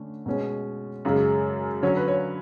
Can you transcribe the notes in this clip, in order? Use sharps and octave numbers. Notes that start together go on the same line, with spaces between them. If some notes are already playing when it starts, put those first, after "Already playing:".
Already playing: D3 A3 C#4
B2 G#3 C#4
F#2 C#3 G#3
D3 F#3 C#4 C#5
B4
C#5